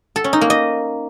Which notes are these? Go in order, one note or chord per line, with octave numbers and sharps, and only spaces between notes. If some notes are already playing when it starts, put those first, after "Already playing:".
A4
C#4
D#4
A#3
D#5